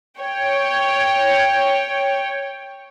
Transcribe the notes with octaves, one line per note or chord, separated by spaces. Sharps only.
C#5 G5